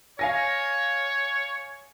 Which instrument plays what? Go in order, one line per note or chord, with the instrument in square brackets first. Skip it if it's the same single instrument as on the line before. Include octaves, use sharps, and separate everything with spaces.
[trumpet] C#5 [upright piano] F5 G#5 A#6